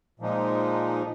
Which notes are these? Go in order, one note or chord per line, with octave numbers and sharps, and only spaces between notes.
A#2 F3 G#3 D#4